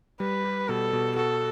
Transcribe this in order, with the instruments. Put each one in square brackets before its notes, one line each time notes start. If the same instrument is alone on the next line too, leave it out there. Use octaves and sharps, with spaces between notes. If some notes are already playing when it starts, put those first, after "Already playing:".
[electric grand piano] G3 [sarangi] B4
[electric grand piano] G4
[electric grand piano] B2 [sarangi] A4
[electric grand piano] B2
[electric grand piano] F#4 [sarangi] A4